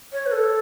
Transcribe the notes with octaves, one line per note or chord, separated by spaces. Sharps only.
C#5
B4
A4